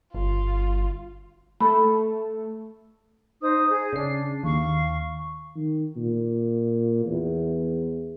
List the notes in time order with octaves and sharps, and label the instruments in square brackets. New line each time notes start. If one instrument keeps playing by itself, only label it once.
[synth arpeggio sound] G1 [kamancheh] F4
[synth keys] A3 A4 [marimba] B5
[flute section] D#4 C5 D#6
G#4
[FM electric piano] C#3 C7 [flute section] D4
[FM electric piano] D#2 [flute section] F5 C#6
[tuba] D#3
A#2
E2